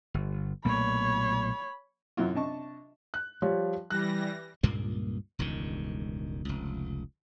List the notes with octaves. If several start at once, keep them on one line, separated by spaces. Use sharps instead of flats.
G1
B1 A#2 A3 C#5 B5
F#2 C3 E3 F#3 E4 F4
C3 D4 D#5 A5 C#6
F#6
F3 G3 C#5
E3 G3 F#6 A#6
C#2 G2 A#2 A#3
E1 C#2 G2 D#3
F1 C#2